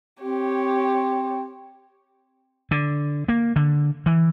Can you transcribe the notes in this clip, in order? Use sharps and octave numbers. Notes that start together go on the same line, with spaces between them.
C4 G4 C#5
D3
A#3
D3
E3